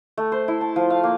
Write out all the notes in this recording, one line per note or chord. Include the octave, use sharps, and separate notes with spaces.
A3
C5
E4
A5
F3
F5
A#3